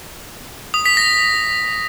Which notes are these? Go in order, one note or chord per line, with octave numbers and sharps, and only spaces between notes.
D#6
B6
A#6